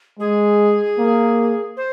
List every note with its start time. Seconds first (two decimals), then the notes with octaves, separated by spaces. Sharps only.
0.20 G#3 G#4
0.98 A#3
1.77 C5